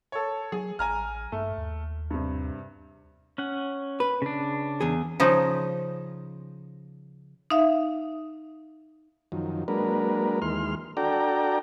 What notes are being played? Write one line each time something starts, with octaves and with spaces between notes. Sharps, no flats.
A4 C#5
F#3 G#4
A1 G#5 A#5 F6
G2 A3
D#2
G2 C3
C#4 F#5
B4
C#3 D4
E2 G#4
C#3 F3 D#4
D#4 E5 F5
F#2 D#3 F3
F#3 G#3 A#3 D4 A#4 B4
D#2 E3 G#3 C6 F6
D4 F#4 A4 D5 G5 A#5